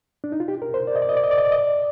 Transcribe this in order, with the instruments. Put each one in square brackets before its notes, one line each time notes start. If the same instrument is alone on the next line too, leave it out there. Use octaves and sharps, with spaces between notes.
[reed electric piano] D4
D#4
F4
G4
A#4
C5
D5
D#5
D5
D#5
D5
D#5
D5
D#5
D5
D#5
D5